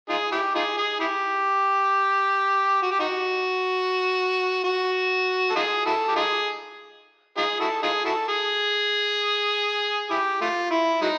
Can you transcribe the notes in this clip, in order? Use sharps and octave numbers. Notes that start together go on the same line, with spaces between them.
D#4 F4 G#4
E4 G4
D#4 F4 G#4
G#4
E4 G4
F#4
G4
D#4 F#4
F#4
A4
D#4 F4 G#4
E4 F#4 A4
G4
D#4 F4 G#4
D#4 F4 G#4
E4 F#4 A4
D#4 F4 G#4
E4 F#4 A4
G#4
E4 G4
A3 F4
E4
F#3 G#3 D#4